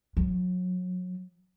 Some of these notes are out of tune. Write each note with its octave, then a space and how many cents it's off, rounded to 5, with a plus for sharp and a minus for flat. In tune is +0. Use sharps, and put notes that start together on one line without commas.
F#3 -30